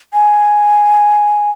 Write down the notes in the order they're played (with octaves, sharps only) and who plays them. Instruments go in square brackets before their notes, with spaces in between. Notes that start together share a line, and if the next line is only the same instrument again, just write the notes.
[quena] G#5